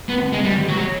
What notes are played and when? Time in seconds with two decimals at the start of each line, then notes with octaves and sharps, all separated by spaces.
0.09 B3
0.33 G#3
0.44 G3
0.69 F#3